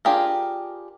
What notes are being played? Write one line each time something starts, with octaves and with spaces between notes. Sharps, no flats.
D4 F4 G4 G#4 A#4